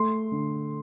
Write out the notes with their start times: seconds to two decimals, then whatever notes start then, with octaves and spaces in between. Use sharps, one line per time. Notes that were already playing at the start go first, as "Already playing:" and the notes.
Already playing: A3 C6
0.32 D3